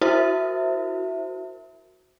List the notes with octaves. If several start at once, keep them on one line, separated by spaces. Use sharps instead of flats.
E4 F#4 A#4 C5 E5